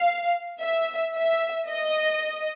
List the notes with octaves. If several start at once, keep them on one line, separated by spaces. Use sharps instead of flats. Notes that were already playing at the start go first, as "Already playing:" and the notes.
Already playing: F5
E5
E5
D#5